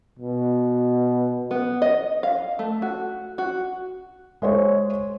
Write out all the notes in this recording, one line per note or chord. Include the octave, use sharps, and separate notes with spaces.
B2
B3
D#5
F5
A3
F#4
F#4
G#3 C5 C#5